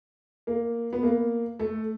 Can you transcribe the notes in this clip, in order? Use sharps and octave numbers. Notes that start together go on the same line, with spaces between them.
A#3
B3
A#3
A3